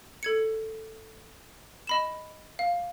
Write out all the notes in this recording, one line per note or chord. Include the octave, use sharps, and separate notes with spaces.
A4 G#6 C#7
D#5 B5 E7
F5